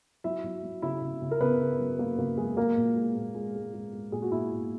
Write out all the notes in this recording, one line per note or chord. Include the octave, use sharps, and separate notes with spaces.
F#3 E4 E5
F#3
F#3
C#3 E4 E5
C#3
C#3
A#4
C#3 B3 B4
C#3
F#3
F#3 A#3 A#4
C#3 A#3 A#4
F#3 G#3 G#4
G#3 A#3 A#4
A#2
G#3
A#2
G#3
G#3
G#3
G#3
A#2 G#4
F#4
A#2 E4
A#2